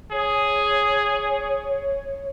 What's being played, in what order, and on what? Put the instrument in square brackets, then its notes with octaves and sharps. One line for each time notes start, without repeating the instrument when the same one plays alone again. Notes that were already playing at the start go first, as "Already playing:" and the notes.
[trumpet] G#4 [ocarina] C#5